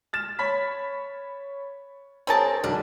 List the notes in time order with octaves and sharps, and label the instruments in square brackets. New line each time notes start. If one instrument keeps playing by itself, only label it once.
[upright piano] F6 A6 E7
C#5 B5 B6
[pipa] C4 A#4 A5 [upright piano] G#4 C#5
[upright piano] B1 [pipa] D4